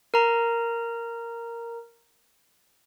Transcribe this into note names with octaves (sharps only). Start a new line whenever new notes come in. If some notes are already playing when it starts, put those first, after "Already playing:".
A#4 A#5